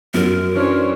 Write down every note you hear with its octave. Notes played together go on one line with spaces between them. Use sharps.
F#2 F#3 A#4
E3 C#4 D4 C5 C#5